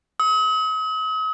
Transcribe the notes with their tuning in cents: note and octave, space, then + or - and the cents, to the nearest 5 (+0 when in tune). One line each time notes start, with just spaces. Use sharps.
D#6 +45